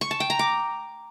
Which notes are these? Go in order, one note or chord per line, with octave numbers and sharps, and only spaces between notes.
C#6
A5
G5
A#5
D6